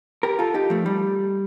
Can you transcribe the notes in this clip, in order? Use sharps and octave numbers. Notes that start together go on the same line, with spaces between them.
G4 A#4
F4 A4
D#4 G4
F3 A3
G3